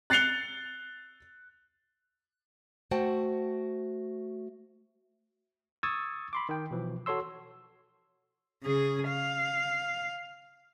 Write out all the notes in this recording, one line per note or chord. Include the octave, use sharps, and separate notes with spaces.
F#6 A6 C7 C#7 F7 G7
A3 F#4 C5 F#5 G5 A5
C#6 D#6 E6 G#6 A6
B5 C6 D6
D#3 G5
B2 E3 F3
F#4 A4 C#5 C6 E6
C#3 G#4
F5